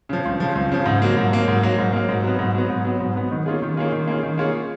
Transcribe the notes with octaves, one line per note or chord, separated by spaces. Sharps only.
C#3 F3
C#2
C#3 F3
C#2
C#3 F3
G#2
F#3 A#3
G#2
F#3 A#3
G#2
F#3 A#3
G#2
F#3 A#3
G#2
F#3 B3
G#2
F#3 B3
G#2
F#3 B3
G#2
F#3 B3
D#3
A#3 C#4 F4 G#4
D#3
A#3 C#4 F4 G#4
D#3
A#3 C#4 F4 G#4
D#3
A#3 C#4 F4 G#4